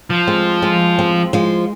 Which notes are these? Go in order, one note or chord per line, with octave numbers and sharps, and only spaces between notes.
F3
G#3 C4
G#3 C4
G#3 C4
F3 G#3